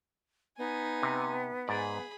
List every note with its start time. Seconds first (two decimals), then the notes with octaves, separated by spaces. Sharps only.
0.58 B3 D#4 G#5
1.03 C3
1.68 G#2 G#4 D5 B5